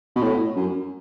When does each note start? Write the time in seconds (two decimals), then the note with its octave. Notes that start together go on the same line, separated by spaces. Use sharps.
0.16 B2
0.22 A2
0.56 F#2